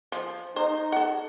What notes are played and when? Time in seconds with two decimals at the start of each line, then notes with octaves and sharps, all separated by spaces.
0.12 F3
0.56 D#4 C5
0.92 A4 F#5